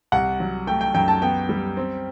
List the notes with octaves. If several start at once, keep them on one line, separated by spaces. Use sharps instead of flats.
C2 F#5
F#3
A3 G5
G5
F#2 G5
A5
B3 G5
G3
C4